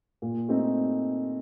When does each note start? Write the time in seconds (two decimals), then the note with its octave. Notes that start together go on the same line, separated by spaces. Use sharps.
0.22 A#2
0.49 A3 C4 D#4